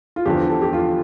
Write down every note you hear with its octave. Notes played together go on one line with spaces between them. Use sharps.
F4
E2 D3 F3 G4
A4
G4
F4